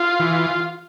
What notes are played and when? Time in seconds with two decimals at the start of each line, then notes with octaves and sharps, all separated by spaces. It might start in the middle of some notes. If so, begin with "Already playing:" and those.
Already playing: F4
0.20 E3